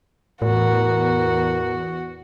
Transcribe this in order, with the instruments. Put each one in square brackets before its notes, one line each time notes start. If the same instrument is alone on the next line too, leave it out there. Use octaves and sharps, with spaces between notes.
[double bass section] E2 [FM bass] A2 [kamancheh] F#4 [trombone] A#4